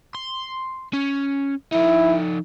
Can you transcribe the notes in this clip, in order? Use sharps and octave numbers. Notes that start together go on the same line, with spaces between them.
C6
C#4
F3 D#4 E4